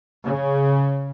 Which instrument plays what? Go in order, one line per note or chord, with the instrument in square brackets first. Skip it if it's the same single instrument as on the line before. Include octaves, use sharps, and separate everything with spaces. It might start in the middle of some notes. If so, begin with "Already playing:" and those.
[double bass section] C#3